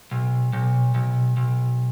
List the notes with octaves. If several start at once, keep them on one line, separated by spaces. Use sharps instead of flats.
B1
B1
B1
B1